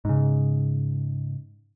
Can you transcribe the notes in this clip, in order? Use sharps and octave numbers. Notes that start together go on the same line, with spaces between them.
G#2 C#3